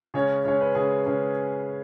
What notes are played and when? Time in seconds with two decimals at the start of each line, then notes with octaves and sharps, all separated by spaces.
0.14 C#3 G#3 C#4 C#5
0.45 C#3 G#3 C#4 C#5
0.61 B4
0.75 C#3 G#3 C#4 G#4
1.06 C#3 G#3 C#4